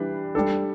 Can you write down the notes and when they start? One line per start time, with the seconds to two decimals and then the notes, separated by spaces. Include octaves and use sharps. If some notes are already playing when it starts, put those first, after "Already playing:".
Already playing: E3 G3 D4 G4 B4
0.35 G3 D4 A4